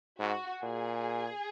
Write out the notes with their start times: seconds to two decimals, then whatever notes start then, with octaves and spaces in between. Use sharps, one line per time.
0.19 G#2 F#4
0.62 A#2 G#4